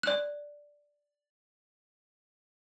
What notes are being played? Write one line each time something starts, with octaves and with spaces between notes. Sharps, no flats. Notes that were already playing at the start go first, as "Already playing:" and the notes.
D5 F#6